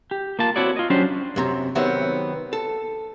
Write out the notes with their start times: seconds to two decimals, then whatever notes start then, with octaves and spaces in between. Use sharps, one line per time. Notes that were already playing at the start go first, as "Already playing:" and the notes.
0.11 G4
0.39 A#3 F4 A5
0.56 C4 E4 F#4 C#5 D5
0.76 F4 D#5
0.90 F#3 C#4 D4 G4 C5
1.36 F#2 C3 A#5
1.75 C3 D#3 F#3 B3 C4 E5
2.53 A4